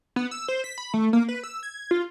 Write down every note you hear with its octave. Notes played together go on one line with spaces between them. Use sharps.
B3
E6
C5
B6
B5
A3
A#3
B4
E6
G#6
F4